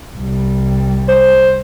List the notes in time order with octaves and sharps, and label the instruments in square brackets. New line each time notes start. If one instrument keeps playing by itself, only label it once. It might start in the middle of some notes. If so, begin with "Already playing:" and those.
[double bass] C2 G3
[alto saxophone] C5